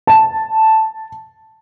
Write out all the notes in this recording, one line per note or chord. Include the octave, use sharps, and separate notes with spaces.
A5